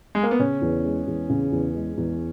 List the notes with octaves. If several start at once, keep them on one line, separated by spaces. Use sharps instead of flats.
G#3
A#3
B3
C#3 C#4
E2
G#3
E2
C#3
E2
G#3
E2